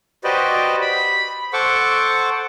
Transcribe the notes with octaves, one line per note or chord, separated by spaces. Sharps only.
F#4 G4 B4 C5 D5 D#5
B5
A4 C5 F#5 C#6 D6